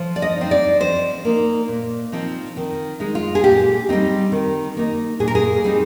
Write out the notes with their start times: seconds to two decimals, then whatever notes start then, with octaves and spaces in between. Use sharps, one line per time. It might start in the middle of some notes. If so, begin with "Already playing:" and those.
Already playing: F3
0.16 D5
0.22 D#5
0.36 C4 D#4
0.51 D5
0.80 F3 C5
1.25 A#3 D#4
1.68 A#2
2.12 F3 C4 D#4
2.57 D#3
3.00 G#3 D#4
3.15 F4
3.35 G#4
3.44 A#2 G4
3.89 G3 C4 D#4
4.32 D#3
4.77 A#3 D#4
5.20 A#2 G#4
5.27 A#4
5.35 G#4
5.64 G3 C4 D#4